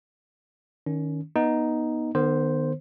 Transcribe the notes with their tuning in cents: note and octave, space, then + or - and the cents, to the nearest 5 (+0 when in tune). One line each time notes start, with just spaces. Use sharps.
D#3 +0 C#4 +20
B3 -20 D#4 +0
D#3 -35 B3 +0 C5 +0